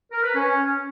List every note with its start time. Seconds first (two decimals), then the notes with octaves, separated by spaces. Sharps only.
0.11 A#4
0.23 B4
0.35 C#4